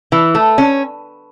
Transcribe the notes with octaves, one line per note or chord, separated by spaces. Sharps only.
E3
A3
C#4